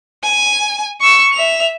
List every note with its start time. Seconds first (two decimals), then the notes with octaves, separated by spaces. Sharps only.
0.24 G#5
1.01 C#6 E6
1.34 E5 F7